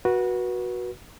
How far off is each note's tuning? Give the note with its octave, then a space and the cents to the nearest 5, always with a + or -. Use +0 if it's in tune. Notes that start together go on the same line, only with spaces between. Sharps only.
F#4 -5 B4 -30